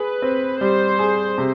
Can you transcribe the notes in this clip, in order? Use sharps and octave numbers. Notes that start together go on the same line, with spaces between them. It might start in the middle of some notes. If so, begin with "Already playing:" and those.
Already playing: G#4 B4
C4
G3 C5
G#4
C3